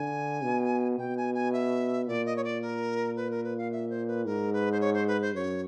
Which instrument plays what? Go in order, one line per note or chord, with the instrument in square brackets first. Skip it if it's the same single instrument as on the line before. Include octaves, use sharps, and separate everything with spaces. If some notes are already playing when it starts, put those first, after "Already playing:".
Already playing: [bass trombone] D3 [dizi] G#5
[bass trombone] B2
[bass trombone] B2 [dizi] G5
[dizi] G#5
G#5
E5
[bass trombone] A#2 [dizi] D5
[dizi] D#5
C#5
D5
A#4
B4
A#4
B4
F5
E5
C5
B4
[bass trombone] G#2 [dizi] A#4
[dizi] B4
C5
C#5
C5
B4
C5
[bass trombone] F#2 [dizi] C#5